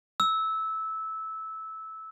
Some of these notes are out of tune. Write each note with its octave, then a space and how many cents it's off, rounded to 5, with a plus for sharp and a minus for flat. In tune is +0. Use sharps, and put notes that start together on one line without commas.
E6 -15